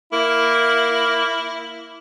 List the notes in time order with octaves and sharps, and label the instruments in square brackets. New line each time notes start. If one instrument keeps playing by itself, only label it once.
[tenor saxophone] A#3 [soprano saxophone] E4